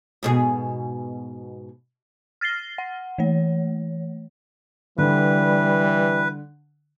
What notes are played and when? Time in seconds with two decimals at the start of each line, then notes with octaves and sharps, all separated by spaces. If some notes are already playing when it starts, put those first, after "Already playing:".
0.23 G#2 B2 G#4
2.41 F6 A6 A#6 C7 G7
2.78 F#5
3.18 E3 A3 C#5
4.98 D3 E3 G3 B4